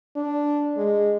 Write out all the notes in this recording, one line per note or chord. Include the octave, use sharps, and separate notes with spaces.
D4
G#3